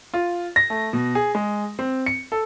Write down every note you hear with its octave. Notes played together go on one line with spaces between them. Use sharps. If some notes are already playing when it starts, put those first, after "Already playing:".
F4
A#6
A3
B2
G#4
G#3
C4
C#7
A4